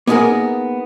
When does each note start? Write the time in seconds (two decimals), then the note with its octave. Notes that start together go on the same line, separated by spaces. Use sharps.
0.07 A#3 B3 D#4 F4 G#4 A#4